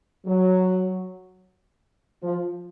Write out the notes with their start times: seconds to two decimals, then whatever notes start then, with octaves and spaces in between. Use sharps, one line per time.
0.26 F#3
2.23 F3